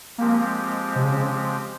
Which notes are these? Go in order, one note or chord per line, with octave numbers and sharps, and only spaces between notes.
F3 G#3 A#3 C4 G4
C3
C#3